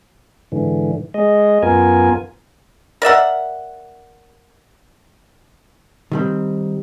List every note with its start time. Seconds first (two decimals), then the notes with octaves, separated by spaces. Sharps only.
0.52 G#2 D3 E3
1.14 G#3 D#5
1.63 F#2 B3 F4 A#4 G#5
3.02 A#4 D5 E5 F#5
6.12 D#3 G3 C4